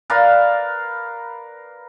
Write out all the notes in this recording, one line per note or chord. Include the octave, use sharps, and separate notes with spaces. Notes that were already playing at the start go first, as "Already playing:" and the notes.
A#4 B4 D5 F5